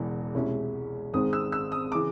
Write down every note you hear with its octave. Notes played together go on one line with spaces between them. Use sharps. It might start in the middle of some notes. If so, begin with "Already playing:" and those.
Already playing: E1 E2 C#3 E3
C2 B2 G#3 C#4 E4
G#1 G#2 D#3 G#3 C4 D#6
E6
E6
D#6
C#3 E3 D6